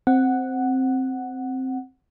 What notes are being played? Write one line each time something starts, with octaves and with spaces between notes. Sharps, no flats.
C4 F#5